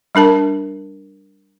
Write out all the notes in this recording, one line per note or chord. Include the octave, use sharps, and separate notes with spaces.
G3 D4 A#4 A5